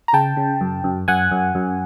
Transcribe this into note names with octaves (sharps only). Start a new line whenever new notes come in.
A#5
C#3 G5 A5
C#3
F#2
F#2
F#2 F#5 G#5
F#2
F#2